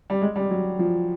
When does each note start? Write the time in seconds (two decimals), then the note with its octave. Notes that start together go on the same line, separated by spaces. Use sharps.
0.10 G3
0.22 G#3
0.36 G3
0.51 F#3
0.79 F3